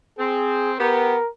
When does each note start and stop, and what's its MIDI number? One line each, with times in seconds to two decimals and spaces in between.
0.19 0.74 60
0.19 0.74 68
0.79 1.15 59
0.79 1.15 67
0.79 1.29 70